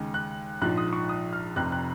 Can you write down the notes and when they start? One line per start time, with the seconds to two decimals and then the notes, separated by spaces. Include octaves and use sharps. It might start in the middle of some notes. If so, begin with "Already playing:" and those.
Already playing: D#2 C#3 G#3
0.14 F#6
0.61 A#1 G#2 F3 F#6
0.78 D#6
0.93 C#6
1.09 D#6
1.33 F6
1.56 F1 F2 C3 F#6
1.72 F#6